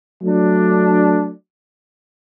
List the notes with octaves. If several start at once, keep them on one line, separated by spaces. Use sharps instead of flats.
F#3 A3 D4